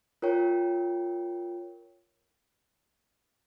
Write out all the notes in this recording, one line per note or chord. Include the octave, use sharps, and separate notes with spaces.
F4 A#4 C#5 G5